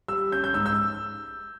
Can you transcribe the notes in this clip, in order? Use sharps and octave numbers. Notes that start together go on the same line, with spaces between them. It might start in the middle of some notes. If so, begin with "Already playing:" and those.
G3 E6
C#4 G6
G6
G#2 E6
E6